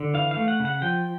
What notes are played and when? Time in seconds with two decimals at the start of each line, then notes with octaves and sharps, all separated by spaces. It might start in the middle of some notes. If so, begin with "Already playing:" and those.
Already playing: D3
0.14 E3 F5
0.31 F5
0.37 A3
0.48 F#5
0.60 C#3
0.65 F#5
0.82 F3 G5